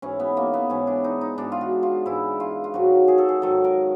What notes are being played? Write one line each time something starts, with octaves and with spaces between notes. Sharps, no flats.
G#2 E3 C#4
B3
A#3
B3
G#2 E3 C#4
D4
D#4
D#4
G#2 E3 D4
F4
F#4
F4
G#2 E3 E4
F4
F4
G#2 D#3 F#3 F#4
G#4
A4
G#4
G#2 D#3 F#3 A4
A#4